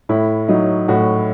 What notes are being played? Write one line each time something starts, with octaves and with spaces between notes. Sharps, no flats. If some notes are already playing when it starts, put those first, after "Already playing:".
A2 E4
F#3 D#4
A2 F#4